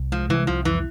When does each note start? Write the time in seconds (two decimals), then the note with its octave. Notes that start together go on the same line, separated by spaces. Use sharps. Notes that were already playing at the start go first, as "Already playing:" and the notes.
Already playing: C2
0.12 F3 G#3
0.29 C2 E3
0.47 C2 F3
0.65 F2 E3